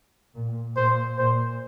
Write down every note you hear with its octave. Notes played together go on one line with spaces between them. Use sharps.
A#2
A#2 C5
A#2 C5